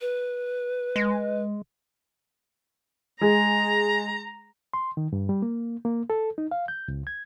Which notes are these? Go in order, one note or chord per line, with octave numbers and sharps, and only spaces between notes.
B4
G#3
G#3 G#4 A#5
C6
D#3
G2
G3
A#3
A#3
A4
D#4
F5
G6
C#2
G#6